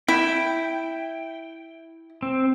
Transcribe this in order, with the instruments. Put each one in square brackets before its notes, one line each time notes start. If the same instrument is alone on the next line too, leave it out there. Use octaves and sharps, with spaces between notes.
[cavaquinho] E4 [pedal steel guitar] G5
[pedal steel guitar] C4